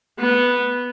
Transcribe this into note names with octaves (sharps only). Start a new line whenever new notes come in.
B3